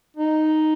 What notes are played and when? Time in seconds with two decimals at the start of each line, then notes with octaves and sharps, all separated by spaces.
0.17 D#4